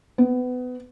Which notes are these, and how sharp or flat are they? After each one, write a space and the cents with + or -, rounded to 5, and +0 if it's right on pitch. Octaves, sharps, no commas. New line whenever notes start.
B3 +25